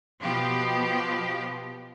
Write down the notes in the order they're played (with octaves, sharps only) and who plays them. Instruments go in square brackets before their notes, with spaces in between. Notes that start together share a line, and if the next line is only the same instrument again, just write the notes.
[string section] B2 F3 B3 G4